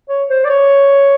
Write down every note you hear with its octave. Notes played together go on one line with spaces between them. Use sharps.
C#5
C5
D5
C#5